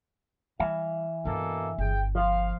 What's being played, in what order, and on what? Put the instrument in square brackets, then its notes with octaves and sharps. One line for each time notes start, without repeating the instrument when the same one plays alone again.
[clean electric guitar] E3 E5 F5 [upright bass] G3
[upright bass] G2 D4 [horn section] B2 A#3 A4
[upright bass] G1 [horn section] G#4 G5
[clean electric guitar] F3 F4 [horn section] F5